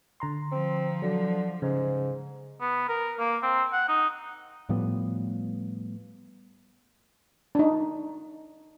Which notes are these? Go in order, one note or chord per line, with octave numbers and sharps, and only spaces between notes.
D3 A#5 C6
F3 C4
D3 F#3
G#2 C#3
B3
A#4
A#3
C4
F#5
D#4
A2 F3 G3 B3
D4 D#4